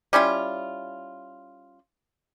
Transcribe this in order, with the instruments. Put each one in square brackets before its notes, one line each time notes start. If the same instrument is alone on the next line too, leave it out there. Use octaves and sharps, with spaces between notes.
[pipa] G3 C#4 E4 F4